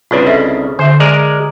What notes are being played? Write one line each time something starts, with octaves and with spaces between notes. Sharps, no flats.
C2 C#3 D4 F4 B4 C#5
A4 D#5 E5
D3 C5 E5
G#3 A#4 D5